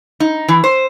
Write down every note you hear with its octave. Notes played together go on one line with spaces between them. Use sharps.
D#4
E3
C5